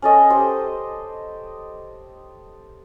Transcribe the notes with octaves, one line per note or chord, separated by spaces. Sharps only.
C#4 A4 D#5
G4 C5